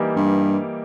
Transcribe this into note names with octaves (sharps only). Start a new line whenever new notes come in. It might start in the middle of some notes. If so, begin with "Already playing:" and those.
Already playing: E3 G3 A#3 D#4 G4
G2